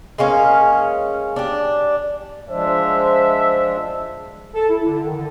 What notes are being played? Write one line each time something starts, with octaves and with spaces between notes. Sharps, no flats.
G#3 A#3 C#4 F5
D4 G4
F3 G#3 D4 C5 E5
A4
E4
D3
D#3
D3